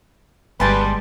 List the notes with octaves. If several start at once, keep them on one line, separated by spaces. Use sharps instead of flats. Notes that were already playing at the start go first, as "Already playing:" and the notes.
G1 G3 G#3 B4 G#5 A5 C6